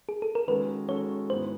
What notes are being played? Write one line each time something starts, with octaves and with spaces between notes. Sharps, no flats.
G#4
A4
A#4
D#3 G#3 C#4 F#4 A4 B4
D#3 G#3 C#4 F#4 A4 C#5
G#2 D#3 G#3 B3 E4 C5